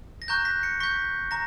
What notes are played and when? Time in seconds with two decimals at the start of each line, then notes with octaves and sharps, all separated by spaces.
0.22 A#6
0.28 A#5 C#6 F#6 G6
0.45 B6
0.63 C#7
0.80 C#6 G6 B6
1.31 A#5 A#6